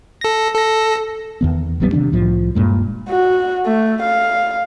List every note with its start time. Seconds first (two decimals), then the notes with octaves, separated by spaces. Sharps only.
0.21 A4 A#6
0.54 A4 A#6
1.41 E2 D#3 B3
1.80 A1 F#3 G3 B3
1.92 C3 D#3 F3 D4
2.12 C2 A2 F3
2.55 D#1 G2 A#2 G#3
3.10 F#4
3.66 A3
4.02 F5